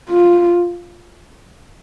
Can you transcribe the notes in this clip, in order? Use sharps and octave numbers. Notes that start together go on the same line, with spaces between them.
F4